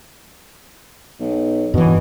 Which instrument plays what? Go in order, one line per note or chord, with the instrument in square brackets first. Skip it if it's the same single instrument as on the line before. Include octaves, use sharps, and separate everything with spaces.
[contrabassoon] B1
[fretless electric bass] G2 E3 [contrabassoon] B2